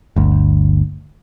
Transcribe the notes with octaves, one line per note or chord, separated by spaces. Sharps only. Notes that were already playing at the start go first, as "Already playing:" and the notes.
G1 D2